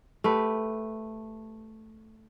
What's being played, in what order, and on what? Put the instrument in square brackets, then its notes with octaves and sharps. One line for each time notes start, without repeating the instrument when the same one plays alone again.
[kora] A3 G4 B4